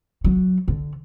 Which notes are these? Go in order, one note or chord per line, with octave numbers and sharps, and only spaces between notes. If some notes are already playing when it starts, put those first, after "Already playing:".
F#3
D3